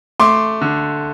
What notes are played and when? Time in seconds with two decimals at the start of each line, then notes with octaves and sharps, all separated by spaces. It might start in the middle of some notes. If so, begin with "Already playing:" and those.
0.20 A3 C6 D6
0.61 D3